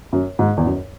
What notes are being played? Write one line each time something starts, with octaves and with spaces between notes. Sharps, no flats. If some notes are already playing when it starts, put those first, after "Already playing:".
F#2
G#2
E2
F#2